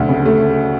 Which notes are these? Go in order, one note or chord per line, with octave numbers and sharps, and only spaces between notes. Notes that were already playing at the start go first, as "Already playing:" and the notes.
Already playing: D2 A3
C#3
A3